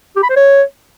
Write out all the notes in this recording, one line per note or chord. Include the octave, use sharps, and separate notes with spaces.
G4
B5
C5
C#5